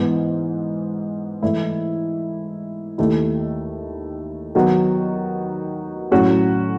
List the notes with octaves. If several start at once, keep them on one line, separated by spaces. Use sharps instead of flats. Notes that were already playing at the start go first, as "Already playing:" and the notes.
Already playing: G#2 E3 B3
G#2 E3 A3 E4
D#2 D#3 A3 E4
D#3 F#3 B3 F#4
A2 F#3 C#4 F#4